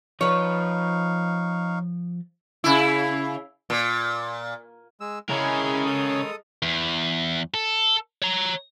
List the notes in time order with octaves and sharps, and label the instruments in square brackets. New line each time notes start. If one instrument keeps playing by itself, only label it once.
[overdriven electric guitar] F3 [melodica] D#4 F5 C#6 [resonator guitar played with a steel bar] B4 C#5
[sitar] C#3 E4
A#2
[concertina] G#3 E6
[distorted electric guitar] C#3 C#4 [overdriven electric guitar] G#3 A#4 [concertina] E4 G#4
[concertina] A4 D#6
[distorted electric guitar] E2
A4
C#5 A#5